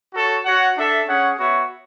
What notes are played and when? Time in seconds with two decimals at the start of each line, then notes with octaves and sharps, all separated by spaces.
0.14 F#4 A4 C#5
0.45 F#4 C#5 F#5
0.77 D4 A4 E5
1.08 C#4 G#4 C#5 F#5
1.39 B3 F#4 C#5 E5